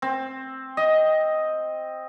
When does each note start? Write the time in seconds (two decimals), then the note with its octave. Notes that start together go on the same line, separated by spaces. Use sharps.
0.02 C4
0.77 D#5